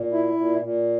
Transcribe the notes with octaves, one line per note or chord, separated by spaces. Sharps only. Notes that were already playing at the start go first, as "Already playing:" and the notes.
Already playing: A#2
E4
A#2
A#2